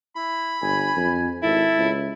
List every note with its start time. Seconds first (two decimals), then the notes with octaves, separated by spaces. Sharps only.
0.16 E4 B5
0.62 G1 G#5
0.97 F2
1.43 G#1 E4 A4
1.77 C#2